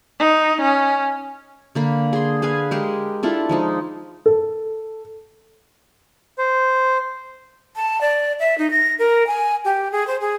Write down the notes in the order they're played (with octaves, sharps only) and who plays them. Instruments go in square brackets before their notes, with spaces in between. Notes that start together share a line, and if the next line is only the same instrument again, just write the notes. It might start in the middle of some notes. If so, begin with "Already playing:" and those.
[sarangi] D#4
C#4
[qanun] D3 A#3 B5
G#4 C6
G#4 B4 F5 G#5
G#3 G4 A#4
D4 E4 F4 A4
F3 G#3 D#4
[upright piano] A4
[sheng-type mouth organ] C5
[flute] A5
D5
E5
D#4
A#6
A#4
G#5
G4
G#4
C5
G#4